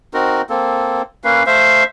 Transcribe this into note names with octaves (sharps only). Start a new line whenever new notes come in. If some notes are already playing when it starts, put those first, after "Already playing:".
C4 D#4 F#4 A#4
A#3 C4 A4
A#3 C#4 B4 F5
A3 C5 E5 F5